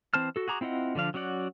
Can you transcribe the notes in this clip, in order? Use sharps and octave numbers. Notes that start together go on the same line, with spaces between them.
E3 C4 C5 A5 F6
F#4 A4
F#4 G#4 A#5 D6
C4 E4 F4 D#5 F#5
D3 F3 D4 F5
F#3 C#4 F#4 D5 F#5